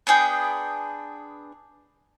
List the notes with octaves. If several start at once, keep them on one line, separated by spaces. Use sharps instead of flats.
B3 D4 G#4 G5